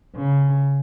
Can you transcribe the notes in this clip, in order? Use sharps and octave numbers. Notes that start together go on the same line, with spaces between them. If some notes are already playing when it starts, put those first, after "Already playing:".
C#3